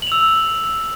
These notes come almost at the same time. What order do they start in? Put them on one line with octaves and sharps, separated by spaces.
F#7 F7 E6